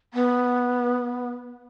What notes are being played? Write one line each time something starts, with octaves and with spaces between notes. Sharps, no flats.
B3